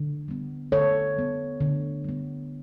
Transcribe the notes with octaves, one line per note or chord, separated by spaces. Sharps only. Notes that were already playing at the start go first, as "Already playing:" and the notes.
Already playing: D3
G3 B3
D3 A4 C#5
G3 B3
D3
G3 B3